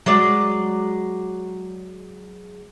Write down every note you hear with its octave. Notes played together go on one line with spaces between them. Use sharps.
F#3 G#3 D5